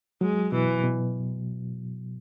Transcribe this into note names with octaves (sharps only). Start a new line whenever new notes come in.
F#3 G#3
B2 E3
B2